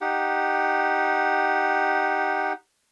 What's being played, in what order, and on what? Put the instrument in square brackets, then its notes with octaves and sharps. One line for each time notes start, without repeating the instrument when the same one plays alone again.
[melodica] D#4 G4 F#5